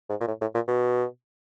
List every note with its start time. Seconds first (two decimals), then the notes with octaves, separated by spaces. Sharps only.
0.09 G#2
0.21 A#2
0.28 A2
0.41 A2
0.54 A#2
0.68 B2